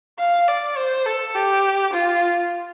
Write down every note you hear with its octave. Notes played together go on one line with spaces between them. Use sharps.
F5
D5
C5
A4
G4
F4